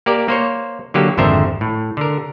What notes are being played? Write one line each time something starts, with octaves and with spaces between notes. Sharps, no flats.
A#3 G4 A#4 D5
A#3 C5 C#5
D3 F#3 A#3 G4
G#1 F2 D3 C5 E5 A#5
A2
D3 A#4